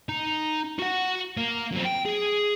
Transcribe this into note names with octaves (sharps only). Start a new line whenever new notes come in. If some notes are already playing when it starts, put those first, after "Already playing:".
D#4
F#4 F#5
A#3
F#2 C4
G5
G#4